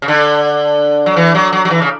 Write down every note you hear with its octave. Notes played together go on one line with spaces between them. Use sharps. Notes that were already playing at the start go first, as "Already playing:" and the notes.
C#3
D3
F#3
E3
F#3
F#3
F#3
E3
C#3